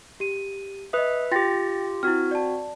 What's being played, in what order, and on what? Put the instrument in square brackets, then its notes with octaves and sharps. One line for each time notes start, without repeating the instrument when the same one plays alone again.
[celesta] G4 D#7
[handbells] B4 E5 [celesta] D#5 D#6
[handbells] F4 G4 [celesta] G5 A6 A#6
[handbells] C4 F#4 [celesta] E4 F6
[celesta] D5 A5